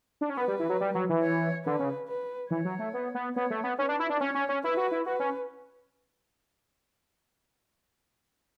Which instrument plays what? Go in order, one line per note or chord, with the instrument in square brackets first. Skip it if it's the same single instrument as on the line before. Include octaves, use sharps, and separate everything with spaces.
[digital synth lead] D4
C#4
[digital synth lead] B3 [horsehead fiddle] B4
[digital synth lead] G3
E3
F#3
G3
F#3
E3
[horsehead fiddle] C#5
[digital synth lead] D3 [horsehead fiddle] B4
[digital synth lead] C#3
[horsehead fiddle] B4
[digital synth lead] E3 [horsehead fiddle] C#5
[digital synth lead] F#3
A3
B3
B3
[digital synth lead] B3 [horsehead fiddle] C#5
[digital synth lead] A3
B3
[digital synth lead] C#4 [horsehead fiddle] B4
[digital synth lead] D4
E4
D4
[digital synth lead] C#4 [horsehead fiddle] C#5
[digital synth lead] C#4
C#4
[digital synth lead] E4 [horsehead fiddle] B4
[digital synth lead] F#4
E4
[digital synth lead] F#4 [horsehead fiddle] B4
[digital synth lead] C#4